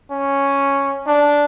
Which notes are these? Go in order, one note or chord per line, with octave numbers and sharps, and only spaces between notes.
C#4
D4